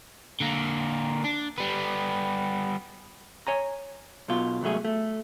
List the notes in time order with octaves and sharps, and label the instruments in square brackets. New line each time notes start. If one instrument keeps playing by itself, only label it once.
[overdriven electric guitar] D3 A#3
D4
G3 B3
[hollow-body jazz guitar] C#5 G#5 A#5
B1 B2 F4
C2 G#2 F#3 A3 G#4
A3